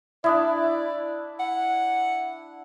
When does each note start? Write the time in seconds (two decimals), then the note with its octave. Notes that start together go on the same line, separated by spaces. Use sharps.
0.24 D4 E4 D5 E5 D#6
1.39 F#5